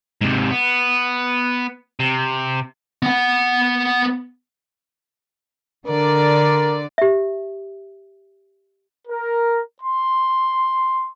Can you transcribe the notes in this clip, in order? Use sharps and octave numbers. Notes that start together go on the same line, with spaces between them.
G#2 C3
B3
C3
B3 F#5
D3 A#4 D5
G4 E5
A#4
C6